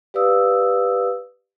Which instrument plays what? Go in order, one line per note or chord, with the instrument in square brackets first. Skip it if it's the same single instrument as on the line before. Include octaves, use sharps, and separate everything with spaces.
[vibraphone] G4 B4 D5 F5 D#6 E6